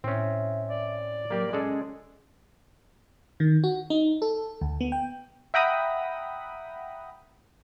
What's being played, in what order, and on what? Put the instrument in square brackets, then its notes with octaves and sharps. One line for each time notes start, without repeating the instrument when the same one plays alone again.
[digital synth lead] A2 [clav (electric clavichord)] C4 C#4 [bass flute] E5
[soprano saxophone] D5
[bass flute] F#3 [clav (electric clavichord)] A#3 G4 A#4
[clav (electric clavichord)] G#3 G#4 A4 [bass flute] C#4
[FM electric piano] D#3
F#4
D#4
A4
D2
B3
G5
[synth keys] E5 F#5 G5 A#5 B5 D#6